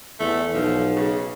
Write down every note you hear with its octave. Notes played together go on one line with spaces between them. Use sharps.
E2 A3
B1 F3
C#3